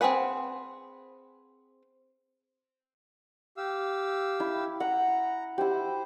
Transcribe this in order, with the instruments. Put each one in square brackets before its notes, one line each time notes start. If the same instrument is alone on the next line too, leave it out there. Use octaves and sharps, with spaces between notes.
[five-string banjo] C4 F#4 G#4 B4 F#5
[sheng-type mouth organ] G4 F5 E6
[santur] E4
[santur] F#5 [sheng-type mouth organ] A#5
[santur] E4 G4 [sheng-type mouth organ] C5